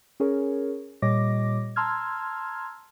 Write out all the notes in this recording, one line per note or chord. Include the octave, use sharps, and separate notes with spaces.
C#4 G#4 A#4 C#5
A#2 G3 C#5 D#5 D6 A#6
A5 A#5 C6 E6 F6 G#6